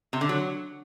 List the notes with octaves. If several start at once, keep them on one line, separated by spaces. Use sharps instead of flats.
C3
D3
F#3